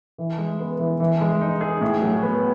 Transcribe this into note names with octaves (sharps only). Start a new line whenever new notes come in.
E3
G#3
B3
E3
E3
G#3
D#4
G#4
A2
F#3
B3